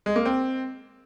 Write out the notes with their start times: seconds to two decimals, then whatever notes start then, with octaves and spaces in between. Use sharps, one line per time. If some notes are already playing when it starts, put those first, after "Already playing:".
0.06 G#3
0.16 A#3
0.25 C4